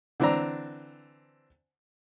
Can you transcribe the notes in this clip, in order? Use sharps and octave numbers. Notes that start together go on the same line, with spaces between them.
D3 E3 C4 D4 A#5